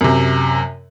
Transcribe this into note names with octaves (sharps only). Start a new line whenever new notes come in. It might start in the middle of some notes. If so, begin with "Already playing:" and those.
F#2 C3